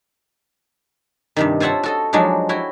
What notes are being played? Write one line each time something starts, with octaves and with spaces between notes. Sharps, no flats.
G2 C3 D#3
F4 C5 C#5 E5 F#5 A5
F#4 A4 D#5
F3 F#3 G#3 D4 D#4 F#4
E4 F#4 C#5 G5